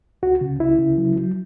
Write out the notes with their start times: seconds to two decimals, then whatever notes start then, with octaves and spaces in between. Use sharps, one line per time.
0.23 C#2 F#4
0.41 C#3
0.59 C#2 E4
0.78 C#3
0.98 F#3
1.16 F#3